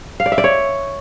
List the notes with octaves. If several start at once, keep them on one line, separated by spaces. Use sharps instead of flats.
F5
D5
E5
D5
C#5